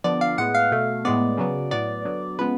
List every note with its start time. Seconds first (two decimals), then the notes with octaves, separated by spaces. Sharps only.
0.04 D3 F3 B3 D5
0.21 F5
0.38 A2 G#3 B3 F#5
0.55 F5
0.71 B2 A3
1.05 A2 G#3 B3 D5
1.38 C#3 F#3 B3
1.71 A2 F#3 B3 D5
2.05 D3 F#3 B3
2.38 C#3 F3 G#3 B3 B4